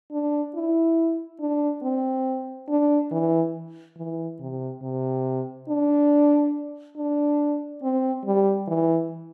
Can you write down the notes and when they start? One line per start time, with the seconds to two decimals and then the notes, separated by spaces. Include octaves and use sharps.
0.11 D4
0.54 E4
1.40 D4
1.83 C4
2.69 D4
3.11 E3
3.97 E3
4.40 C3
4.82 C3
5.69 D4
6.97 D4
7.83 C4
8.25 G3
8.68 E3